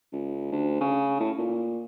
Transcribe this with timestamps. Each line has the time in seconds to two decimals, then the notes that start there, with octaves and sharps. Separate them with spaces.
0.12 C#2
0.52 D2
0.81 C#3
1.19 A2
1.38 A#2